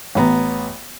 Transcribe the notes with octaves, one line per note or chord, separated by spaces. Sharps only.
A1 B3 A#5